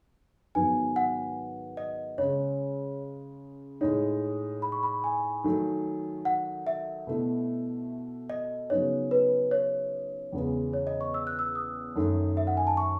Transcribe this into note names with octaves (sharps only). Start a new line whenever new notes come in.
G#2 D#3 F#3 B3 G#5
F#5
D#5
C#3 G#3 C#4 C#5
A2 G#3 D#4 C#5
B5
C#6
B5
G#5
D#3 F#3 A3
F#5
E5
B2 A3 E4
D#5
C#3 F#3 B3 D#4 G#4 C#5
B4
C#5
E2 C#3 E3 G#3 B3
C#5
D#5
C#6
E6
F#6
E6
D#6
F#2 D#3 A3
E5
F#5
G#5
A5
C#6